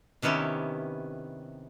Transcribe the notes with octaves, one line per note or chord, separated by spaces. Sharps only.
C3 D#3 B3 C#4 E4 G4